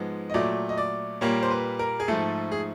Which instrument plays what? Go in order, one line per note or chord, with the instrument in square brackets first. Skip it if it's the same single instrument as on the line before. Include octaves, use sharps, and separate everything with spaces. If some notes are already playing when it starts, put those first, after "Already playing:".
Already playing: [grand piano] G#2 F3 G#3 B3
D#5
A#2 F#3 A3 D5
D#5
D5
A#2 G3 A#3 C#5
C5
B4
A#4
G#4
G#2 F3 A3 A4
G#4